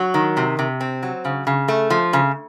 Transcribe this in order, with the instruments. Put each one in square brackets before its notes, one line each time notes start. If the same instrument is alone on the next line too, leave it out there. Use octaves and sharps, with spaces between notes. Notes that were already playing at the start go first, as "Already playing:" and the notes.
Already playing: [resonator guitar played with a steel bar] F#3
D#3
C3
C3
C4
F#3
C#3
C#3
A3
F3
C#3